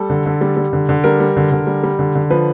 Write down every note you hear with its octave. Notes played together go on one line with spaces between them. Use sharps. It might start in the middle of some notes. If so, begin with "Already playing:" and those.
Already playing: G3 A4
D3
D3
G3
G3
D3
D3
G3 A#4
G3
D3
D3
G3
G3
D3
D3
F3 B4